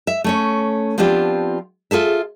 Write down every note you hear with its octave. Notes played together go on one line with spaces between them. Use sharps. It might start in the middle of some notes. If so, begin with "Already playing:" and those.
E5
A3 C#4 C#5
F3 B3 C4 D4 F4 G4
F4 G#4 A4 E5